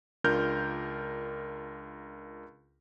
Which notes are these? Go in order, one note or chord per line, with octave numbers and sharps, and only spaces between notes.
C#2 D4 F4 A#4 F6 G6